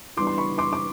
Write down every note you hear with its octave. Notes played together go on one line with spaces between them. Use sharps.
E3 G3 B3 D4 C6 D6
C6
B5 C#6
C6 D6
D6